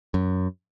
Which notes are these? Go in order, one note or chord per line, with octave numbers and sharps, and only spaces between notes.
F#2